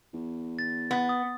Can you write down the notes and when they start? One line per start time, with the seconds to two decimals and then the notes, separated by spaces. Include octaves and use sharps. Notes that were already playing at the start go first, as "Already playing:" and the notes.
0.14 E2
0.59 A6
0.91 B3
1.09 D#6